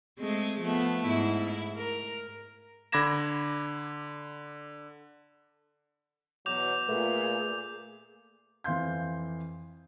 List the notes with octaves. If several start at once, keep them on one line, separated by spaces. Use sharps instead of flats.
G#3 A3 C4
F3 A3 B3
G#2 E4
A#4
D3 B5 D6 G#6 A#6 E7
E2 B2 F#3 D6 G6 F7
A#2 A3 G#4 B4
F2 E3 F5 C6 G6